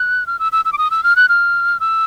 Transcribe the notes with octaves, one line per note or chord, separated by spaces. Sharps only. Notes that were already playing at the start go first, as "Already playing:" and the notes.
Already playing: F#6
F6
E6
E6
E6
D6
D#6
E6
F6
F#6
F6
E6